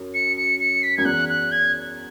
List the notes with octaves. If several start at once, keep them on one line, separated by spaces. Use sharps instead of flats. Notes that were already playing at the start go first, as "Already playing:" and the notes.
Already playing: F#2
C#7
C#7
C#7
B6
F#2 G#6
E2 F#6
F#6
G#6